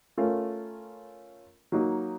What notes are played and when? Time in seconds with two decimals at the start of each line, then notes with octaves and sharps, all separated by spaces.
0.17 A3 C#4 F4 A#4
1.72 F#3 A#3 D#4